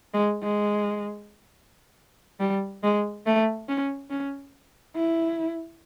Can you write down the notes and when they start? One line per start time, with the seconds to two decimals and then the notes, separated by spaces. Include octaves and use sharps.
0.14 G#3
0.42 G#3
2.40 G3
2.83 G#3
3.26 A3
3.68 C#4
4.10 C#4
4.96 E4